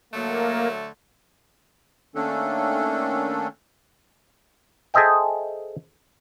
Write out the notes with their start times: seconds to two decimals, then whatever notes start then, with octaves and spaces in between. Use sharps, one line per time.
0.13 D3 F#3 A3 A#3
2.15 D#3 A3 A#3 C#4 D4 A4
4.94 G#4 A4 C5 D#5 E5 G5